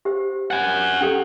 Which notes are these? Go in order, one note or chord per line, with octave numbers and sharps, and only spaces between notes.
G4 C5
F#5 G#5
C#4 G4 A4